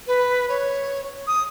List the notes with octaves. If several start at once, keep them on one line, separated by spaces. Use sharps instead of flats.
B4
C#5
D#6